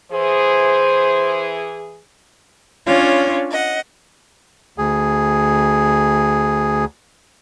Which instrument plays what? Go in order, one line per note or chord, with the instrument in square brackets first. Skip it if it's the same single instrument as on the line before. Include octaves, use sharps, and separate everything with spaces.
[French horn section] E3 G#4 [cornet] C5
[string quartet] C#4 D4 F4 C#5
D#5 F#5
[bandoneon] D2 G#4